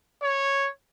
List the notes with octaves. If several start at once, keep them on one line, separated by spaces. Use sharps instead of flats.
C#5